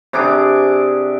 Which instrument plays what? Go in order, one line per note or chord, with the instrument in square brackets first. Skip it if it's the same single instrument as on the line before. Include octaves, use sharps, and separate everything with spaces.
[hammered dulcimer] C3 D4 G#4 D6